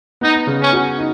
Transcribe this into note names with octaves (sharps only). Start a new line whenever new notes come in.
B3 D#4
C#3
C#4
F#4
D#4